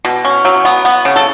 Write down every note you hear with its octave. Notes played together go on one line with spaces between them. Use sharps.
B2
C#4
F#3
B3
B3
C#3
A4